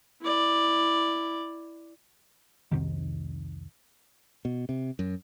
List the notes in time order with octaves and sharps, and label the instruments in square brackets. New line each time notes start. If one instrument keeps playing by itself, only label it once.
[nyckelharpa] E4 D5
[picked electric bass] C2 F2 C3 D#3
[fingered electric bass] B2
C3
F#2